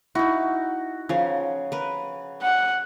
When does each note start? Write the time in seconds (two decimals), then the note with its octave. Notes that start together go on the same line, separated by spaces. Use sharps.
0.15 D#4 E4 F#4
1.09 C#3 F3 A#4
1.72 A#4 B4
2.43 F#5